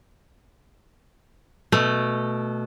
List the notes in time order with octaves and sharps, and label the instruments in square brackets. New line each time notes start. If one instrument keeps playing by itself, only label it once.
[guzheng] B2 [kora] A3